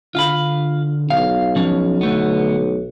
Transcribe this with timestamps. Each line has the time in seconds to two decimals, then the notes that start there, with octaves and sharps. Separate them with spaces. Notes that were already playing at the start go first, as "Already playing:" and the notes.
0.15 D3 F4 F5 B5
1.10 B1 F5
1.56 F3 C#4 D4
2.01 D3 A3 B3